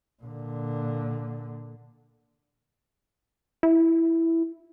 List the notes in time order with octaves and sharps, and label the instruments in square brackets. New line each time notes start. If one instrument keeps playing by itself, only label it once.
[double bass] A#2 D3
[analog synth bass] E4